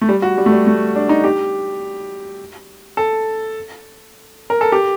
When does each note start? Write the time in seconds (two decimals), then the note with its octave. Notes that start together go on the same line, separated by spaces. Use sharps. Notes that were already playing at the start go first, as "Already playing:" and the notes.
0.01 A3
0.09 G3
0.22 F#4
0.37 G3
0.46 A3
0.52 G3
0.67 A3
0.96 D4
1.09 D#4
1.24 G4
2.97 A4
4.50 A#4
4.61 A4
4.72 G4